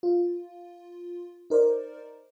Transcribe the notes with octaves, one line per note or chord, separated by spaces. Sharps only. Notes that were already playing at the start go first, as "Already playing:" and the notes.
F4
D#4 A#4 C5 D5